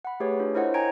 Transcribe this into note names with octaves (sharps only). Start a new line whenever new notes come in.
F#5 B5
A3 G4 G#4 B4 C#5
D4 F4
E4 A#4 C5 C#5 D#5 F#5
G5 G#5 A#5 G#6 D7